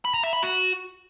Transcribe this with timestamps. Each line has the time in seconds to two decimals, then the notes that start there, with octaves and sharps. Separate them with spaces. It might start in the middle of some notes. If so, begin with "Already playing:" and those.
0.05 B5
0.14 A#5
0.24 E5
0.33 B5
0.42 F#4